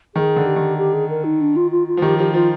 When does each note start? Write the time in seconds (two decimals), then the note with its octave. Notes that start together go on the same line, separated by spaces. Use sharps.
0.15 D#3 G#4
0.36 D3
0.46 G4
0.56 D#3
0.78 G4
0.94 G#4
1.09 A#4
1.24 D#4
1.41 D4
1.56 F4
1.71 F4
1.88 F4
1.97 F3
2.02 D#3 G4
2.19 F3 G4
2.34 F3 F4